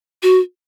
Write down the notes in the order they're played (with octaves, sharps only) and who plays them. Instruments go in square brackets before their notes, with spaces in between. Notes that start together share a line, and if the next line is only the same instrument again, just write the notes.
[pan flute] F#4